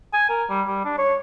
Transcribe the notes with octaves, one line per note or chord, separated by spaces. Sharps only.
G#5
A#4
G3
G3
D4
C#5